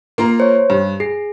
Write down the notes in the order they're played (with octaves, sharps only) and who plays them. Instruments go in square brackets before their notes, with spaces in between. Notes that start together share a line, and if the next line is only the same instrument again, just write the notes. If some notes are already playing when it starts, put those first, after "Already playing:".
[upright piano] A#3 F4 A#5
[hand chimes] C5 C#5
[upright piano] G2
[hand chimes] G#4 [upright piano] C7